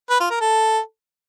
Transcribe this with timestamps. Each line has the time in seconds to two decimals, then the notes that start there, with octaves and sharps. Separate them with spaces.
0.10 B4
0.20 F4
0.30 A#4
0.41 A4